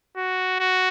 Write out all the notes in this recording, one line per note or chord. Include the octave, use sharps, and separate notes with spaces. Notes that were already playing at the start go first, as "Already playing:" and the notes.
F#4
F#4